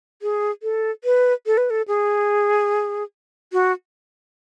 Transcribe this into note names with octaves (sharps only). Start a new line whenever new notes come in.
G#4
A4
B4
A4
B4
A4
G#4
F#4